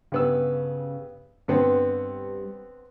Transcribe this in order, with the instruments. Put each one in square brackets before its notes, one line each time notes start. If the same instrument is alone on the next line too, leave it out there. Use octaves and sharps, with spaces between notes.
[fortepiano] G2 B3 E6 [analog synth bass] C#3
[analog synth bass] G2 [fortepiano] D3 B3 C4